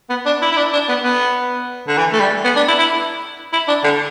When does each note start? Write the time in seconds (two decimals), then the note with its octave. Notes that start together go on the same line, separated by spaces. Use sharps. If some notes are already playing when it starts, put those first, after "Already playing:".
0.10 B3
0.26 D4
0.41 E4
0.51 E4
0.57 D4
0.73 D4
0.88 B3
1.04 B3
1.88 D3
1.98 E3
2.12 A3
2.20 G3
2.44 B3
2.56 D4
2.68 E4
2.79 E4
3.53 E4
3.68 D4
3.84 D3